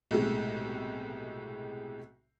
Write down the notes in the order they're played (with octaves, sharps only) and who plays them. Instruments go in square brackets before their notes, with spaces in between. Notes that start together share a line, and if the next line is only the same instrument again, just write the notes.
[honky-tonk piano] B1 A2 C3 G#3